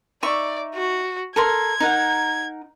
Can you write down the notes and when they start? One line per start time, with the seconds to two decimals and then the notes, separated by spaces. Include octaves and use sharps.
0.23 D#4 D5 E5 C#6
0.75 F#4
1.36 A4 A#4 C6 G#6
1.80 D#4 A#4 F#5